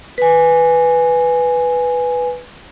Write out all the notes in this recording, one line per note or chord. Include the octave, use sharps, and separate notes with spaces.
B4 G#5